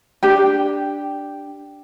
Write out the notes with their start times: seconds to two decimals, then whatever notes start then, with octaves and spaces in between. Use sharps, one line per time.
0.23 D4 G4 G5